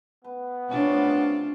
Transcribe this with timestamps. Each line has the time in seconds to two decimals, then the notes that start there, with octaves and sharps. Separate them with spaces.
0.24 B3 B4
0.69 C3 A3 C#4 D4 F4 F#4